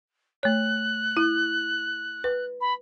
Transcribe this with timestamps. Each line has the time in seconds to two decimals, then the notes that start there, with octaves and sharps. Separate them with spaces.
0.43 A3 C#5 F#6
1.17 E4
2.24 B4
2.61 B5